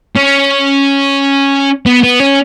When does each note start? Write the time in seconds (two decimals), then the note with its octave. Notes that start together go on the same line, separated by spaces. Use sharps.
0.16 C#4
1.86 B3
2.03 B3
2.20 C#4